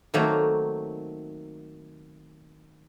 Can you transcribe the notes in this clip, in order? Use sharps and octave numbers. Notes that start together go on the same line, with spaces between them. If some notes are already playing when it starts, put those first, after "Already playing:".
D#3 F#3 A3 A#3 C4